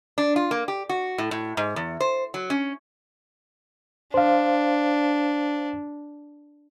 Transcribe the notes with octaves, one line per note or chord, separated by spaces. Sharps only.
D4
F4
A#3
G4
F#4
A2
A2
G#2
E2
C5
F#3
C#4
D4 C5 F5